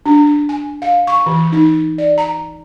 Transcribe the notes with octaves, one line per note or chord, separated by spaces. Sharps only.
D4
G#5
F5
C#6
E3
D#4
D5
A#5